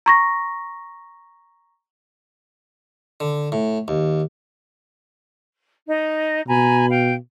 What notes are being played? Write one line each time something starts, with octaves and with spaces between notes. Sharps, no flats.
A#5 C#6 A#6
D3
A2
D#2
D#4 D#5
B2 G#5 A#5 B5
F5 G5